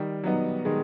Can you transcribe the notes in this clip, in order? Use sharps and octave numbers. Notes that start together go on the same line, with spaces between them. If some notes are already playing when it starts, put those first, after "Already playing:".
Already playing: D#3 G3
F#3 B3 D#4
D#3 G#3